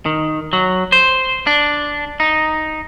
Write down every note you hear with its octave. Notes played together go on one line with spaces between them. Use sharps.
D#3
F#3
C5
D4
D#4